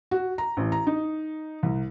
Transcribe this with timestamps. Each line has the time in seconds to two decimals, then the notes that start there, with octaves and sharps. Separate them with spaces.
0.11 F#4
0.38 A#5
0.57 A1
0.72 A#5
0.87 D#4
1.63 C2